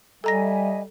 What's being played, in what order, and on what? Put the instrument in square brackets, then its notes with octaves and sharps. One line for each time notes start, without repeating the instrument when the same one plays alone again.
[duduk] G3 [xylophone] A4 A#5 A#6 [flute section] D#5 E5 G#5